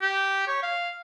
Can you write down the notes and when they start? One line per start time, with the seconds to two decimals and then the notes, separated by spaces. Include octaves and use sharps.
0.02 G4
0.48 C#5
0.63 F5